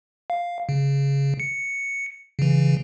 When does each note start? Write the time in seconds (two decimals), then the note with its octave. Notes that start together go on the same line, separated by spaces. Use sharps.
0.30 F5
0.69 C#3
1.40 C#7
2.39 C#3 E3